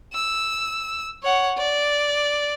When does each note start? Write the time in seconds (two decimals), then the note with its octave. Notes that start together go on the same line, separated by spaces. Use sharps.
0.14 E6
1.23 C#5 F#5
1.58 D5